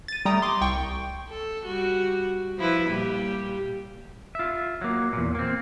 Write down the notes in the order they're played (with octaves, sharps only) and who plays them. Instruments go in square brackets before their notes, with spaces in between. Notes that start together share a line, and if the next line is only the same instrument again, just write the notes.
[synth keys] A6 D#7
G3 A3 G5 A#5 D#6
C6 D6
C2 G5 C#6
[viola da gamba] A4
G3 F#4
F3 E4 B4
A#2 G3 G4
[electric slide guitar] F4 E5
F#3 A#3
E2 A#2
A#3 C4